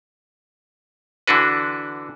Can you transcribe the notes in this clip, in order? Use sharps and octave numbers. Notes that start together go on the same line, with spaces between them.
D3 E3 D4 F#4 B4